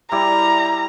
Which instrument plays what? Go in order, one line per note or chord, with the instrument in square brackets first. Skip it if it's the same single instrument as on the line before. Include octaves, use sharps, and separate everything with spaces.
[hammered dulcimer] G3 E4 D5 [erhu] A#5